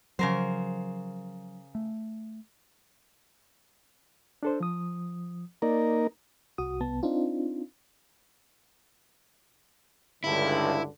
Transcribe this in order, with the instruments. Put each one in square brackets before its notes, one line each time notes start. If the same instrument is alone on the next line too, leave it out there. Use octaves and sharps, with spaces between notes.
[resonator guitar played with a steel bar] C#3 A#4 C5 [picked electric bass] F3 F#3
[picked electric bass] A3
[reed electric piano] D4 A4 C5
F3 D#6
[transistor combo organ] A#3 D#4 A#4 [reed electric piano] D5
[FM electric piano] C2 F#4 D#6
C2 B3 A5
C4 D4 D#4 F4
[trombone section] C#2 G2 D3 [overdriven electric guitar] E4